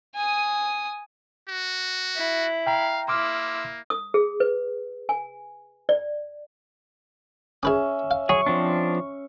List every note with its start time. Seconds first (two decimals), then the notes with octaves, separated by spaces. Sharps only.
0.15 G#5 D#6
1.49 F#4
2.16 E4
2.67 F5 G5 A#5
3.08 A#3 E4 C6 D6 E6 F6
3.90 D#6
4.14 G#4
4.40 B4
5.09 G#5
5.89 D5
7.63 C#4 G#4 B4 E5 D#6
8.11 F5
8.29 F#3 G#4 C#6
8.46 F3 C4 D4